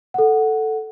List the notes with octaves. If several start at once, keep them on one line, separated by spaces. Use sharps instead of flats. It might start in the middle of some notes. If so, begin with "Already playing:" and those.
A4 F#5